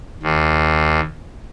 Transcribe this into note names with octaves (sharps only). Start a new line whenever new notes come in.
D#2